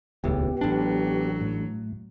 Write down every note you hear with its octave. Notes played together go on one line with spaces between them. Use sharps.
D#1 C#2 A2 B3 G4
A1 F#3 D4
A2